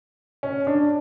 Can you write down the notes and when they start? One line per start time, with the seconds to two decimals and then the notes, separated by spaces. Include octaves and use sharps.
0.43 C#4
0.67 D4